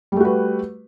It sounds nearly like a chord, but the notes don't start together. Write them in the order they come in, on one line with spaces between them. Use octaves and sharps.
G3 A3 F#4 B4